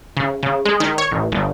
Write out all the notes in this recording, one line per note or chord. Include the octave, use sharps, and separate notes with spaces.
C#3
C#3
G#3
D#3
C#5
A1
G1